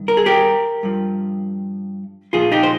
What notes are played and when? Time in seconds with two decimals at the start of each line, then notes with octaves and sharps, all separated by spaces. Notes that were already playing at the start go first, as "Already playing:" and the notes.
Already playing: G2 D#3
0.08 A#4
0.17 G#4
0.26 G4 A#4
0.83 G2 F3
2.33 A#2 F3 F4 G#4
2.52 D#4 G4
2.63 C5